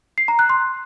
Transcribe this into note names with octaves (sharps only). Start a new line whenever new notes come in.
C7
A#5
F#6
C6